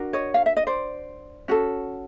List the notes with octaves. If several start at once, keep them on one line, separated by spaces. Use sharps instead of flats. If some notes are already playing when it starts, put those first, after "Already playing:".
Already playing: D4 F#4 A#4
C#5 D#5
F5
E5
D#5
C5 D5
C#4 F#4 A4